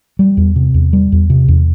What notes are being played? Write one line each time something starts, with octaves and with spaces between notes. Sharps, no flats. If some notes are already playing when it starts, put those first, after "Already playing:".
G3
E2
C3
E2
G3
E2
C3
E2